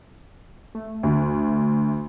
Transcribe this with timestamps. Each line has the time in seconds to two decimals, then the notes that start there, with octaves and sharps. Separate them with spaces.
0.75 A3
1.03 D2